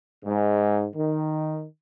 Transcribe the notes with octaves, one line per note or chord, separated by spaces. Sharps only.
G#2
D#3